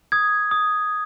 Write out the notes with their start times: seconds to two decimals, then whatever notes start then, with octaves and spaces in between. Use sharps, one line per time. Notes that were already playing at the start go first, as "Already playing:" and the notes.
0.12 D#6 G#6
0.51 D#6